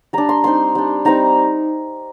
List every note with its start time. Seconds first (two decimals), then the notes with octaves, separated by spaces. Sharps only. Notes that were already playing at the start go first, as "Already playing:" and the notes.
0.13 G3 D4 A#5
0.29 C6
0.44 G3 C4 D#4 C6
0.75 G3 D4
1.05 G3 C4 D#4 A#5